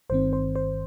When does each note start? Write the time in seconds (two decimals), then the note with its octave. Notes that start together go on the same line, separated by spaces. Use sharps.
0.10 G1 G2 D#3 C4 C5
0.33 C5
0.56 C5